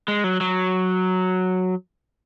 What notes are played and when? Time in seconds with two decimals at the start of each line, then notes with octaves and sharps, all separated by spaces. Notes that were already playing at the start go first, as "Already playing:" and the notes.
0.08 G#3
0.24 F#3
0.41 F#3